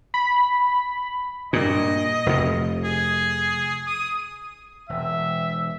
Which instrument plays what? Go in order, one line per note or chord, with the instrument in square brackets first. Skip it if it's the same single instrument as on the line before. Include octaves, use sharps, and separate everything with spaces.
[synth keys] B5
[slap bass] G2 A#2 [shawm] D#5
[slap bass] F1 F2
[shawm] G#4
D#6
[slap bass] E1 [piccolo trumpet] E5